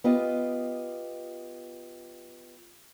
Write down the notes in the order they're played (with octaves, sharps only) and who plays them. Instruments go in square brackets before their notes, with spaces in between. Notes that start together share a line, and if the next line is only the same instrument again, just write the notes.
[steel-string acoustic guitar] B3 F4 G4 D#5